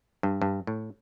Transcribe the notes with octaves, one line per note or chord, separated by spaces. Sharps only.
G2
G2
A2